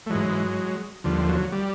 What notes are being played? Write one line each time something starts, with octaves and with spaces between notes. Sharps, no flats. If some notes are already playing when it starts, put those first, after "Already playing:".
A3
G#2 E3 F#3 G#3
D#2 D3 F3 G3
F#3
G3